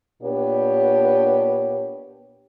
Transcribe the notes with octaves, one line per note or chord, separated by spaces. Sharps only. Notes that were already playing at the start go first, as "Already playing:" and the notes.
A#2 B3 D4 G4 C#5